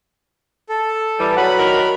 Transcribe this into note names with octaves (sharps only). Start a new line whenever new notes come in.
A4
E3 G3
F#3 B4 F#5 B5
D#3 A#4